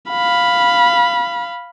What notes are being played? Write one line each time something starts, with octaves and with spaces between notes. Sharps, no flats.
F5 B5